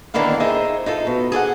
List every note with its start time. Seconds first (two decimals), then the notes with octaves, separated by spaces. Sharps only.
0.14 E2 D3 D#3 A#3 E4 F5
0.40 D#4 G#4 C5 E5
0.86 D#4 F4 A4
1.07 B2
1.32 G#4 A4 D5 F#5